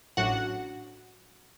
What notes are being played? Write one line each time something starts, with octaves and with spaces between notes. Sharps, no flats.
A1 A2 F#3 D4 F#4 F#5